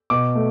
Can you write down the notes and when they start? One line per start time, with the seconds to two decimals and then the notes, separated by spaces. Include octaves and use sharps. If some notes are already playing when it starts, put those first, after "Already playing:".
0.10 B2 D6
0.35 A3